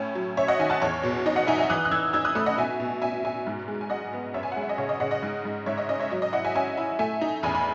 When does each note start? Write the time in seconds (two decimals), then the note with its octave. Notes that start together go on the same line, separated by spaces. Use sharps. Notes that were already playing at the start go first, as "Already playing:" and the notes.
Already playing: A2 C#4
0.15 F#3
0.37 C#4 C#5 E5
0.48 D#5 F#5
0.59 D#3 E5 G#5
0.70 F#5 A5
0.82 E2 C#5
1.03 B2
1.26 D#4 D#5
1.36 D#5 F#5
1.47 D#4 E5 G#5
1.58 E5 G#5
1.70 E3 D#6 F#6
1.85 F#6
1.91 E3 E6 G#6
2.13 D#4 E6 G#6
2.25 D#6 F#6
2.35 A3 B5 D#6
2.46 D#5 F#5
2.57 B2 E5 G#5
2.80 B2
3.02 B2 E5 G#5
3.24 B2 E5 G#5
3.47 G#2
3.68 G#3
3.81 G#5
3.90 G#3 D#5 F#5
4.13 B3
4.34 F#2 C#5 E5
4.43 G#5
4.52 F#5
4.56 G#3
4.61 E5
4.69 D#5
4.78 C#3 C#5
4.89 D#5
5.00 C#3 D#5 F#5
5.11 D#5 F#5
5.23 G#2
5.45 G#2
5.66 G#2 C#5 E5
5.78 D#5
5.89 C#4 D#5
5.99 C#5 E5
6.10 F#3 D#5
6.22 D#5
6.32 E4 D#5 F#5
6.45 E5 G#5
6.55 C#4 E5 G#5
6.77 E4
6.99 A3 E5 G#5
7.21 D#4
7.43 E2 G#5 B5
7.55 B5